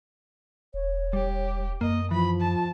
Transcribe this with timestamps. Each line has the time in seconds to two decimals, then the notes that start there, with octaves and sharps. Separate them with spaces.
0.74 E1 C#5
1.13 G3 G4
1.81 F#2 A#3 D#5
2.11 E3 F3 B5
2.41 A5